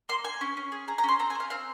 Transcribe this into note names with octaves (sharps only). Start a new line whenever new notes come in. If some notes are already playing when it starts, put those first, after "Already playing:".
A#3 C6
A#3 G#5
C#4
C#4
G#4
G#4 A#5
A#5
C#4 C6
C4 A#5
G#5
C4 F5
C4 F5